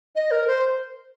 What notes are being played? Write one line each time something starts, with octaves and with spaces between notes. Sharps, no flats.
D#5
A#4
C5